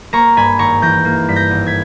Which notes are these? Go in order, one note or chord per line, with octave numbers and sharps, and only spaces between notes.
A#3 A#5 C#6
G2 G#5 B5
G#1 A#5 C#6
E3 G6 A#6
A#3
G2 B6
G6 A#6
G#1
G#6 B6